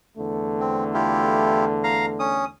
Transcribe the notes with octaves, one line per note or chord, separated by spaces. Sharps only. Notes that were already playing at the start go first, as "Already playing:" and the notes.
E2 D3 A3
C4
E4 F4 G4
F5 A#5
C#4 D#6